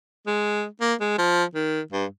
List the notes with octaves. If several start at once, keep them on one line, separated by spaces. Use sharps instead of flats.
G#3
A#3
G#3
F3
D#3
G2